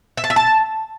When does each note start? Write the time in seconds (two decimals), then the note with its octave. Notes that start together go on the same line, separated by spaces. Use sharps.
0.17 E5
0.24 A5
0.30 E5
0.36 A5